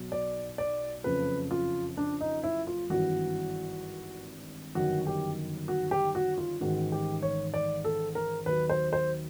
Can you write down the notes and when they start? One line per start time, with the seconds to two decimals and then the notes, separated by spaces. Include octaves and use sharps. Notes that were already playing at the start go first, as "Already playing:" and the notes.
Already playing: B1 B2 F#3
0.12 D5
0.58 D5
1.04 F#1 F2 C#3 F3 B4
1.51 F4
1.97 D4
2.21 D#4
2.43 E4
2.67 F4
2.90 G#1 G2 E3 F#4
4.75 G1 F#2 D#3 F#3 F#4
5.07 G4
5.68 F#4
5.91 G4
6.15 F#4
6.38 F4
6.61 A1 G#2 D#3 F#4
6.92 G4
7.22 C#5
7.54 D5
7.85 A4
8.15 A#4
8.46 D#2 D#3 F#3 B4
8.70 C5
8.93 C5